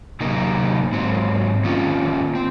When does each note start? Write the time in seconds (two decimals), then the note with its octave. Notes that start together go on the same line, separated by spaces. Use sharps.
0.20 C3 F#3 A#3 D#4 A#4
0.92 G#2 F#3 C4
1.64 D#3 A#3 C#4 F4
2.35 C4